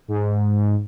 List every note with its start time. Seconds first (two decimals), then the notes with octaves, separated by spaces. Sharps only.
0.08 G#2